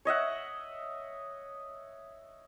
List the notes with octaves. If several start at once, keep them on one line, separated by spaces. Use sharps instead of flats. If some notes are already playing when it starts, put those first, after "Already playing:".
C#5 D#5 E5 F#5